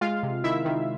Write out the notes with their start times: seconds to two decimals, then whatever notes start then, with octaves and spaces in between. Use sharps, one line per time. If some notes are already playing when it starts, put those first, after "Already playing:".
0.01 G#3 F4 F5
0.23 C3
0.44 D#3 E4 E5
0.65 D#3